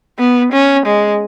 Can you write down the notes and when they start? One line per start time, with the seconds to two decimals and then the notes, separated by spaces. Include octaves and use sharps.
0.19 B3
0.53 C#4
0.86 G#3